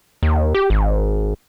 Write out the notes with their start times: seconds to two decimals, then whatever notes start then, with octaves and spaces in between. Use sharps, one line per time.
0.23 D#2
0.54 G4
0.70 G#1